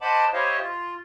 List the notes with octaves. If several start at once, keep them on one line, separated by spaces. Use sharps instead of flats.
C5 D#5 F#5 A5 B5 D6
E4 G4 C5 C#5 D#5 F5
F4